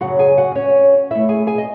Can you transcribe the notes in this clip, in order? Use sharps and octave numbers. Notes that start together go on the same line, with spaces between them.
F#2 C#3 F#3 F#4 F#5
G#4 G#5
F#4 F#5
C#4 C#5
B2 A3 E4 E5
G#4 G#5
G#4 G#5
D#5